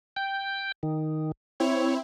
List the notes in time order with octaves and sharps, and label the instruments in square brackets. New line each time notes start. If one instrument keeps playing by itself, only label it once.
[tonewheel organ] G5
D#3
[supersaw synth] C4 E4 [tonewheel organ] C#5